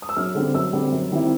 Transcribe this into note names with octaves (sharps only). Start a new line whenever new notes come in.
D#6
E6
F#2 F6
D3 G3 C4
F#2 E6
D3 G3 C4
F#2
D#3 G3 C4 E4